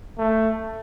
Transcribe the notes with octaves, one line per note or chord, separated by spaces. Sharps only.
A3